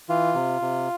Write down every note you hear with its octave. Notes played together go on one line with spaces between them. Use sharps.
E3 F4
C3
C3